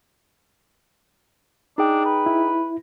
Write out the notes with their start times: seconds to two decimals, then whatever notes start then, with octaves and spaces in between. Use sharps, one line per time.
1.78 D4 D#4 G#4 G5
2.05 B4
2.26 E4